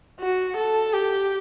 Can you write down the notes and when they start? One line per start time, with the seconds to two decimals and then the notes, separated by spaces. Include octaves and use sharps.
0.21 F#4
0.57 A4
0.93 G4